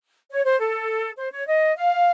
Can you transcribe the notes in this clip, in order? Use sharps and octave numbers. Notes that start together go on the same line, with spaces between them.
C#5
C5
A4
C5
C#5
D#5
F5